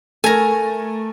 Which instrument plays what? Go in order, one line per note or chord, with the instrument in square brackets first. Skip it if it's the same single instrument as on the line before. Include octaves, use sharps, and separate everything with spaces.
[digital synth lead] A3 [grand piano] A4 A#4 [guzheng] G#5 A#5